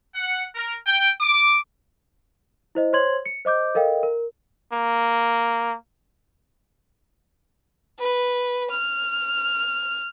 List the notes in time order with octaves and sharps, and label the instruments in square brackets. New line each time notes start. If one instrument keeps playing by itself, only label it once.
[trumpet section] F#5
A#4
G5
D6
[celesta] E4 C5 D#5
C5 C#5 C6 G#6 F#7
C#7
C5 D#5 D6 G6
A4 A#4 D#5 F5 G5
A#4
[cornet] A#3
[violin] B4
F6